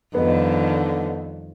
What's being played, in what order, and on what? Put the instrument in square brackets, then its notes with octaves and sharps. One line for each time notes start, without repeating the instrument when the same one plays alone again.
[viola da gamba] F2 D#3 G3 [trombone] D3 [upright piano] B3 D#5